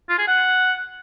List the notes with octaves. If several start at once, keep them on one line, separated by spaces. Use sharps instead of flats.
F4
G#4
F#5